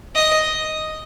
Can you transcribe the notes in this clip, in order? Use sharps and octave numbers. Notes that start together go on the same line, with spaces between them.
D#5